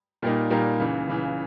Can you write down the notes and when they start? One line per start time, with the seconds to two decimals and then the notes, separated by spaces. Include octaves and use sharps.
0.22 A#2 G3 A#3 D#4
0.50 A#2 G3 A#3 D#4
0.79 C#2 C#3 E3
1.07 C#2 C#3 E3